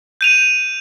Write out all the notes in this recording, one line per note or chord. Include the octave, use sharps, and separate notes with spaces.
G6 D#7 F7